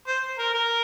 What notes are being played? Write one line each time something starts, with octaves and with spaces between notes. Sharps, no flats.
C5
A#4
A#4